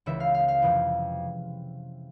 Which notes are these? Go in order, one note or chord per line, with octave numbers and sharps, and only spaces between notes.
C#2 C#3 E3 E5
F5
F5
F5
F2 C3 E3